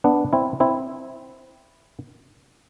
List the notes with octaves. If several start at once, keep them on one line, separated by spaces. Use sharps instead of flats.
B3 D4
C4 E4
C4 E4